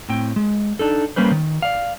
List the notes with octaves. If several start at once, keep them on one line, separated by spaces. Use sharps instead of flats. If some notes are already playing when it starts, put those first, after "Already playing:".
A2 C4 G5
G#3
D4 D#4 A4
G3 A#3 C#4 B4 C5
D#3
D5 F5